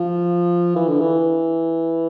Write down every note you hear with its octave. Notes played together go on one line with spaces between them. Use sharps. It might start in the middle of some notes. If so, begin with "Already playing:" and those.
Already playing: F3
E3
D3
E3